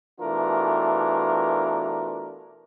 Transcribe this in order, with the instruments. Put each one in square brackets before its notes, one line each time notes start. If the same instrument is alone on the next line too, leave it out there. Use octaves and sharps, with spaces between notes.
[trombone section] B2 E3 A3 D4 F4 A#4